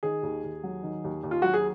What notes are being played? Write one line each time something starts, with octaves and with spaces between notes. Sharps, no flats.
D#3 G#4
D#2
D#2
F#3
D#3
D#2
D#2
F4
F#3 F#4
G#4